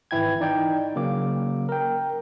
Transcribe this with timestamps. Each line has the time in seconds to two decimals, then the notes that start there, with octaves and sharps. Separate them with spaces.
0.11 G#1 E3 E4 G5 G#6
0.40 D#4 D5 G5
0.96 C#3 F#3 A#3 D6
1.69 A#4 G5